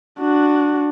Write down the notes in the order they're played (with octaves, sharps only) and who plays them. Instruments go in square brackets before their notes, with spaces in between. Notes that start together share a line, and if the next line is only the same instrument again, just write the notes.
[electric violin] D4 F#4